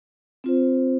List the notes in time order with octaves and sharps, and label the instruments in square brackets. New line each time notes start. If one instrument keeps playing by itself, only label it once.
[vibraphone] C4 F4 C5